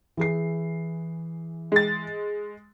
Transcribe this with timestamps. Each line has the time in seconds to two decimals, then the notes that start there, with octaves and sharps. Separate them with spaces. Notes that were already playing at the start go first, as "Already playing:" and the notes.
0.17 E3 G#4 C7
1.72 G#3 A6